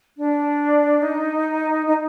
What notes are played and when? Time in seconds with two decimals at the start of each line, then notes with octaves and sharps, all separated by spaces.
0.17 D4
1.02 D#4
1.86 D#4